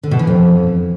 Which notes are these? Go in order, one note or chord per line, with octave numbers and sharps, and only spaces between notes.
D3
B2
E3
F2